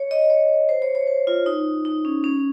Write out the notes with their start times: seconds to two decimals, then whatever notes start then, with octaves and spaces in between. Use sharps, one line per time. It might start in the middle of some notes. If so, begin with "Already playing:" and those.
Already playing: C#5
0.11 D#5
0.30 C#5
0.69 C5
0.82 C#5
0.95 C#5
1.07 C5
1.27 F4
1.46 D#4
1.85 D#4
2.05 C#4
2.24 C#4